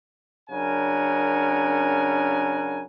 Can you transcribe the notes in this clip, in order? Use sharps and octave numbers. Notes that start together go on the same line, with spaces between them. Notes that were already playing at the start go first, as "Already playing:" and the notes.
F#2 C#3 D4 A#4 F#5 G#5